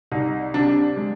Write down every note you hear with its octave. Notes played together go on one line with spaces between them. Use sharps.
C2 D#4
C3 D4
D4
G#3